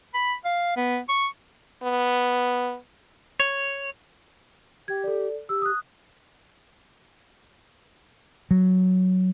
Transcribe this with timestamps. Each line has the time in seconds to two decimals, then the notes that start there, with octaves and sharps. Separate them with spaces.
0.14 B5
0.45 F5
0.77 B3
1.09 C#6
1.83 B3
3.40 C#5
4.88 G4 G5 G#6
5.04 A4 D5
5.49 G4 E6
5.62 D#6 F#6
8.51 F#3